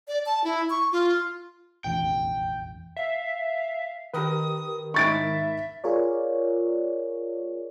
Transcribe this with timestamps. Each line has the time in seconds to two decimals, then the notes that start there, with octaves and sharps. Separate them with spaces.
0.08 D5
0.26 A5
0.44 E4
0.70 C#6
0.92 F4
1.84 F1 A#1 E2 G5
2.97 E5 F5
4.14 D#3 G4 A#4 B4 D#6
4.94 G#2 D#4 E5 B5 C#6 A6 D7
5.84 F4 G#4 A#4 C#5 D5